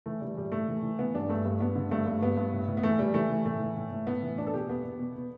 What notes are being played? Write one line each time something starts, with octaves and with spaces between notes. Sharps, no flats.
E3 A3
E3 G3
A2 G3
A2 A3
E3
E3
E3 B3
G2 D4
G2 A3
G2
G2 B3
D3
G2 A3
G2
G2 B3
G2
A2
A2
B3
E3 A3
E3 G3
E3 A3
E3
A2 A3
E3
A2
A2
A2 B3
E3
B2 D4
A4
B2 G4
E2 B3
E2
B2
B2